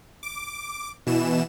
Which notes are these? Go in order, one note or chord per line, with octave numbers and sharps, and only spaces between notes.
D6
B2 E3 E7